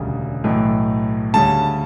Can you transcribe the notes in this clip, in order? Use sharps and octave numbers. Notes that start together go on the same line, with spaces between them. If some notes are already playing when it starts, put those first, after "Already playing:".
Already playing: E1 D2 C#3 G3 C#4
B1 A2 E3
D2 C#3 G3 C#4 A5